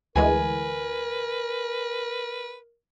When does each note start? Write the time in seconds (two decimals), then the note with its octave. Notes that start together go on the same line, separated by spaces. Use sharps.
0.16 D2 E3 G#3 A#4 B4 G#5